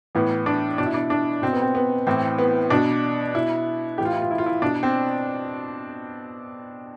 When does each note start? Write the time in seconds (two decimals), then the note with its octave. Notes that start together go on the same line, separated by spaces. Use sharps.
0.15 A2 E3 B3
0.46 D4
0.78 B2 D4
0.86 E4
0.94 D4
1.10 D4
1.42 B2 C4
1.53 B3
1.62 C4
1.75 B3
2.07 A2 E3 C4
2.38 B3
2.70 B2 D4
3.34 B2 E4
3.98 A2 E3 G4
4.05 F4
4.13 E4
4.22 F4
4.31 E4
4.38 F4
4.46 E4
4.62 B2 D4
4.83 C4